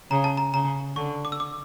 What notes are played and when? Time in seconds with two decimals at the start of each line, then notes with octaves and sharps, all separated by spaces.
0.11 C#3 A#5
0.24 A5
0.37 A#5
0.54 C#3 A#5
0.96 D3 C#6
1.25 D6
1.32 E6
1.40 D6